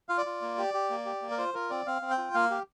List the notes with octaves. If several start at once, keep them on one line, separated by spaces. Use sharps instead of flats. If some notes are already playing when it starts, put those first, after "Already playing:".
F4 F5
D5
F4
A#3
G4
G4
A#3
G4
A#3
A#4
F4 C5
F4 A#4
C4 D5
C4 F5
C4
G5
F4
A#3 F5
G4